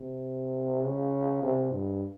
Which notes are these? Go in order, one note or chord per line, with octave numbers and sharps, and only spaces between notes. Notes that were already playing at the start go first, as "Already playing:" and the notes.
Already playing: C3
C#3
C3
G2